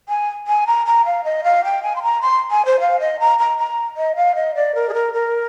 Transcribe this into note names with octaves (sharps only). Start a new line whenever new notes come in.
G#5
G#5
A#5
A#5
F5
D#5
F5
G5
G#5
C6
A#5
C6
G#5
C5
F5
D#5
A#5
A#5
A#5
D#5
F5
D#5
D5
A#4
G#4
A#4
A#4